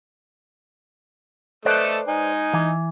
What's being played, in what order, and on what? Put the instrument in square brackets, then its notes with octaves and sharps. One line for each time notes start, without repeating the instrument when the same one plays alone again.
[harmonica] A3 A4 D#5 [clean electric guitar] B4 C5 D5
[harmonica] D#4 G#5
[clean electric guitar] E3